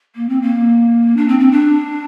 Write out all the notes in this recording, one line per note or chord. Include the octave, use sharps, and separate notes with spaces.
A#3
C4
A#3
D4
C4
C4
D4